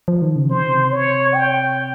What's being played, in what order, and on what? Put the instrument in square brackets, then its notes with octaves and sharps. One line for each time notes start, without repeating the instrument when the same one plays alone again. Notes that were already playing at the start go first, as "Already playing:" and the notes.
[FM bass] F3
D#3
C#3
[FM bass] C3 [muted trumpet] C5
[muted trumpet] C#5
G5